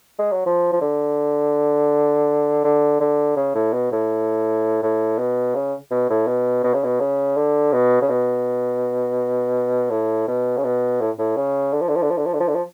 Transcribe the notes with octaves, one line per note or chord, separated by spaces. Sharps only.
G#3
F#3
F3
F3
D3
D3
D3
C#3
A2
B2
A2
A2
B2
C#3
B2
A2
B2
B2
C#3
B2
C#3
D3
B2
C#3
B2
A2
B2
C#3
B2
A2
A2
C#3
D3
F3
D3
F3
D3
F3
D3
F3
D3
F3
D3
F3